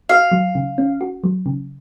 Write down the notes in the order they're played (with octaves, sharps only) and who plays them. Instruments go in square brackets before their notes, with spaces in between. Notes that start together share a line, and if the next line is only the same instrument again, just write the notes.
[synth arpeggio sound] F#4 [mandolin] F5
[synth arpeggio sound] F#3
C#3
C#4
F#4
F#3
C#3